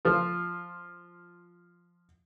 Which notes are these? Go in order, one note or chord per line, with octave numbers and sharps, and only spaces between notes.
F3 F4